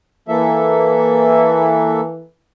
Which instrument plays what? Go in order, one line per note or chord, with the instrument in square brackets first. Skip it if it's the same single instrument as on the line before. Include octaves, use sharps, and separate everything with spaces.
[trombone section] E3 [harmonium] A#3 A4 E5